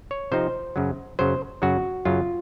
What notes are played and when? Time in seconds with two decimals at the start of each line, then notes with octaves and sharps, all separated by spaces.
0.11 C#5
0.32 C3 F3 C4 D#4 C5
0.76 F#2 C#3 F#3
1.19 F#2 C#3 F#3 C5
1.62 F#2 C#3 F#3 F#4
2.05 F#2 C#3 F#3 F4